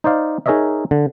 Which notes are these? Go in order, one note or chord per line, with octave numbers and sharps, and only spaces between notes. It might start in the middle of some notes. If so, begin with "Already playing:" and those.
D#4 C5 D5 F5
D#4 G#4 A#4 C#5 D#5 E5
D3